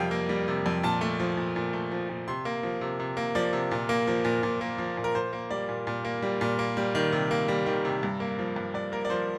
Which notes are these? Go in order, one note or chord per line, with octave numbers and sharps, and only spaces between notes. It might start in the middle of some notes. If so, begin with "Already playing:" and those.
Already playing: F2 C3 G3 A#3 F5 G5
A#3
G3
C3
F2
A#2 A5
A3
F3
A#2
A#2
A3
F3
A#2
C3 C6
A#3
F3
C3
C3
A#3
F3 D5
C3
A#2
A#3
F3
A#2
A#2
A#3
F3
A#2
A#4
A#2 C5
A#3
G3 D5
A#2
A#2
A#3
G3
A#2
A#3
G3
D#3
C3
A#3
G3
D#3
C3
G2
A#3
F3
G2
G2 D5
A#3 A#4
D5
F3 C5